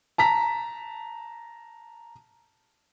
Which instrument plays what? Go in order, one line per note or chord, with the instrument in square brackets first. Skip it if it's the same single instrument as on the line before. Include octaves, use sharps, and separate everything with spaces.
[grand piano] A5 A#5 B6